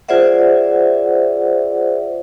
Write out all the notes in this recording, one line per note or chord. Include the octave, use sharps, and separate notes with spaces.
F4 G#4 C5 D5 E5 F#5